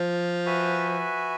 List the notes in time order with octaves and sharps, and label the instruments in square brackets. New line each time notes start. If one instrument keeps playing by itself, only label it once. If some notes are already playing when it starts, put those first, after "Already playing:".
Already playing: [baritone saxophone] F3
[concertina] F#4 B4 E5 G#5